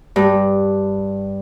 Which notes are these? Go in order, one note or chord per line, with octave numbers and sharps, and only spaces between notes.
G2